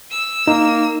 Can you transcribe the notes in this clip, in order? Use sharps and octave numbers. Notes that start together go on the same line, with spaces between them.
E6
A#3 D#4 A#5